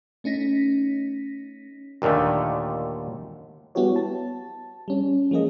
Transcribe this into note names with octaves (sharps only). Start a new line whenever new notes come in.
A3 C#4 D#4 A#6 B6
D#2 A#2 D3 D#3 A3
G3 B3 E4 F#4 G4 C#5
A5
G3 C#4
F3 G#3 A#3 G#4 D#5